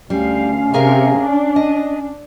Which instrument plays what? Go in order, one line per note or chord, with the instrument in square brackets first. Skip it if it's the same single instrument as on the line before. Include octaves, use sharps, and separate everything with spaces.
[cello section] D2 F5 [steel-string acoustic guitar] G3 [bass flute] C#4
[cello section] C3 [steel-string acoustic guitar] G#4 A#4 F5
[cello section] D4
[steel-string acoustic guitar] D#5